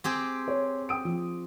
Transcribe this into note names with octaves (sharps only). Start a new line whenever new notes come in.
C4 G4 G#4
C#5
G5 D#6 D7
F3